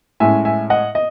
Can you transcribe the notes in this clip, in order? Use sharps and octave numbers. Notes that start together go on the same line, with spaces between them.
A2 G#3 C#4 E5 G#5
E5 G#5
D#5 F#5
D#5